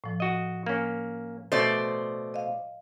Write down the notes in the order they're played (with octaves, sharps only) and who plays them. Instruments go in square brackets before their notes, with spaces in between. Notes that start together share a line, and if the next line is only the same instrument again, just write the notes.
[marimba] A2 F3
[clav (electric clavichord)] F#4 D#5
A#3 C#4
[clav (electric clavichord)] B2 A3 [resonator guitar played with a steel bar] C5 D5
[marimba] D#5 F5